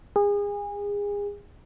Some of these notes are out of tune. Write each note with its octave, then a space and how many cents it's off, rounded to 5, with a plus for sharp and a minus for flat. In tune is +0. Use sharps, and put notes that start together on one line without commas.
G#4 -30